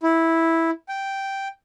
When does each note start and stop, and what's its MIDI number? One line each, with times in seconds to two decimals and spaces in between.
0.03 0.70 64
0.89 1.48 79